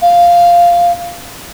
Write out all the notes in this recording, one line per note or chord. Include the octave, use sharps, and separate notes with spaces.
F5